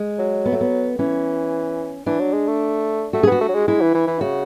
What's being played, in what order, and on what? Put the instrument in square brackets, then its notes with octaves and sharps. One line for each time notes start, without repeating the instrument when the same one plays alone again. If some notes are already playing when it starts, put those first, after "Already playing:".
Already playing: [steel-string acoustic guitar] G#3
[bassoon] F#3
[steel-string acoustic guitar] B3
A3
B3
[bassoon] E3 [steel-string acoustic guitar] C#4
[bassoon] E3 [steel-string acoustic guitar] D4
[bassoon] F#3
G#3
A3
[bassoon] A3 [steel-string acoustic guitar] F#4
[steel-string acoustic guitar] G#4
[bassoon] B3 [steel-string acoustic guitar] F#4
[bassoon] A3
F#3
G#3
[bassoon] G#3 [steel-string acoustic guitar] E4
[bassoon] E3
E3
E3
[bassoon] C#3 [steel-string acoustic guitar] F#4